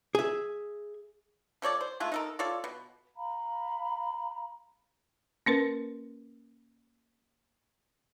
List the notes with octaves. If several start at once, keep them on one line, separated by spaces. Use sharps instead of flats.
G#4 E5
F3 A4 C#5 D5
C5
G#3 A3 F4
D#4 A4 A#4
F4 A4 C#5 D5
B2
F5 A#5 B5
A#3 C#4 A#4 B4